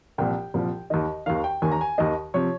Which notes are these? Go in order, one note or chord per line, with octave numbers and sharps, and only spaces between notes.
C2 A#2 F3 G5
C2 A#2 F3
D#2 D#3 D#5
D#2 D#3 F5
G5
D#2 D#3 G#5
A#5
G#5
D#2 D#3 D#5
C3 F3 C#5